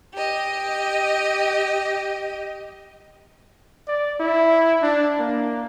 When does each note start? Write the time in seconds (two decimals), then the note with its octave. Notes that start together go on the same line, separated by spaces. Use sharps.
0.13 G4 D#5
3.88 D5
4.20 E4
4.82 D4
5.20 A#3